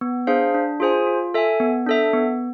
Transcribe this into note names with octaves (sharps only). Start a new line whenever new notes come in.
B3
D4 G#4 C5 F5
D4
F4 G#4 C5 G#5
F4
A4 E5 G#5
B3
D4 A4 E5
B3